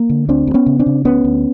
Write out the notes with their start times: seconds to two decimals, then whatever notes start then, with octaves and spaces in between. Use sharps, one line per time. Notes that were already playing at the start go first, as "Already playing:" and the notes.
Already playing: A#3
0.09 D3
0.28 D2 C4 D4
0.47 D2
0.54 B3 C#4
0.66 C#3
0.79 C4 D4
0.86 C#3
1.05 D2 B3 C#4
1.24 D2